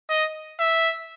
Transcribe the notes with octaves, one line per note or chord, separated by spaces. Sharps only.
D#5
E5